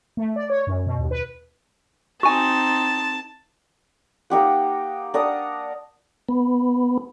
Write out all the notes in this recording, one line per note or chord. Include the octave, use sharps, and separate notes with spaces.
A3
D5
C#5
F#2
B2
D#2
B4
C4 D#4 F#4 G#5 A5
A#3 D#4 G4 F#5
D4 A#4 F#5 D#6
B3